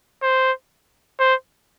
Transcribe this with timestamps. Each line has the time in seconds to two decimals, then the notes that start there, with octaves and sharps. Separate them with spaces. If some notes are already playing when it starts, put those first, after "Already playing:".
0.22 C5
1.20 C5